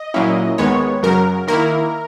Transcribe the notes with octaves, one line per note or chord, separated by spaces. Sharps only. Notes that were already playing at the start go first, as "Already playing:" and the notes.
Already playing: D#5
A#2 F#3 A#3 C#4 E4
D#2 D#3 G#3 B3 C#5
F#2 C#3 F#3 A#4
D#3 A#3 E4 A#4